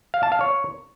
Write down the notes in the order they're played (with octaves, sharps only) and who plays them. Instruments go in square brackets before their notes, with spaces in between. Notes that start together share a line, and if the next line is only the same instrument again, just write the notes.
[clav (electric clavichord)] F5
A5
F5
C#5